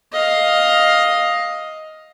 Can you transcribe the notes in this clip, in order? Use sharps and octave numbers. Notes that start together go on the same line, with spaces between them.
D#5 F5